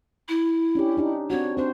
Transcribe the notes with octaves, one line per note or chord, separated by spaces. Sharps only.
E4
C#4 D4 G4
D4 D#4 G4
C4 D4 F#4 C#5
C4 D4 C5